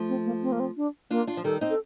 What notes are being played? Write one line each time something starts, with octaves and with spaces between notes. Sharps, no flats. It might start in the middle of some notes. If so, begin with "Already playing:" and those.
Already playing: F3 A3
C4
A#3
C4
A#3
C4
D4
A#3 D4 F4
D4 F4
F3
D#3 G3 A4
C4 D#4
A4